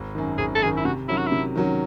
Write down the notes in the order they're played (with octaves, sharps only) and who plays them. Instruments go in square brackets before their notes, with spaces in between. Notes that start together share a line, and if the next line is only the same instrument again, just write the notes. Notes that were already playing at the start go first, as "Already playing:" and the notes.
Already playing: [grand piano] G#1
F#2 D#3
[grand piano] G#1 [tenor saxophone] G#4
[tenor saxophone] A4
[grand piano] F#2 D#3 [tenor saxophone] G#4
[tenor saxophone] E4
[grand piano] C3 [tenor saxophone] F#4
[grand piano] D#3 F#3 C#4 [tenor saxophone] E4
[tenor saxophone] F#4
E4
[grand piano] C3
D#3 F#3 C#4